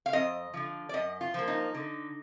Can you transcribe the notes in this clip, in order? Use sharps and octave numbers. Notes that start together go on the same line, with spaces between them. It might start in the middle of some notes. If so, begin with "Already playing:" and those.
F5
F2 D#5
D3 F3
D5
F#2 D#5
F4
F3 A#3
D#4
D3